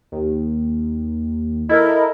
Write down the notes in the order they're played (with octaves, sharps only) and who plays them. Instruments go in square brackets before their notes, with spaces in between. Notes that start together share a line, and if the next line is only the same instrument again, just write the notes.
[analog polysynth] D#2
[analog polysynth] E4 A4 A#4 [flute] D#5